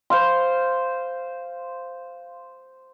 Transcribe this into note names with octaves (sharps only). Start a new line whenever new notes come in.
C5 F5 C6